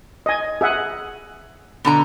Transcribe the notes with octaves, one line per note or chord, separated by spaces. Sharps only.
D#5 G#5
G#4 E5 F#5
B2 D3 A#5